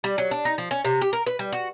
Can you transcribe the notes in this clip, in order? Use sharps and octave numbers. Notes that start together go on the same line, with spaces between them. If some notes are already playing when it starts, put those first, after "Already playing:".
G3
F#3
D4
D#4
F3
C#4
C3
G4
A#4
B4
G3
F#4